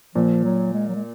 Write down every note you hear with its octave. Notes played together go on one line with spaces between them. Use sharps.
A#2 F3
F#3
G#3
F#3
G#3